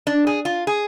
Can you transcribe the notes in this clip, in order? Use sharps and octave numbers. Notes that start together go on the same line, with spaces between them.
D4
G#4
F4
G#4